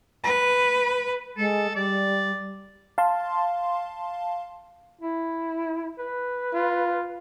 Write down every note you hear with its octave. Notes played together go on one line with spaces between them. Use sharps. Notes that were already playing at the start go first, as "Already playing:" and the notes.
B4
G#3 A4
G3 D5
F5 A5 C6
E4
B4
F4